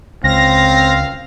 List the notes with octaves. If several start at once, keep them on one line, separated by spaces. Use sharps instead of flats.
C#2 C4 F5 A#6